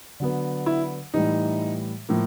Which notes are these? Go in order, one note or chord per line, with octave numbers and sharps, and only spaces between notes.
D3 F#3 B3
E4
A2 E3 G3 D#4
A2 F3 A#3